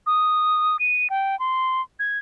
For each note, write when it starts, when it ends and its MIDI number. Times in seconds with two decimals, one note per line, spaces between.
0.06 0.77 87
0.79 1.08 99
1.10 1.38 79
1.39 1.82 84
1.99 2.18 92